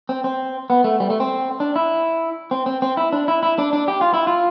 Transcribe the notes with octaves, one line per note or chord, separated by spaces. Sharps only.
C4
C4
B3
A3
G3
A3
C4
D4
E4
C4
C4
C4
E4
D4
E4
E4
D4
D4
G4
F4
E4
F4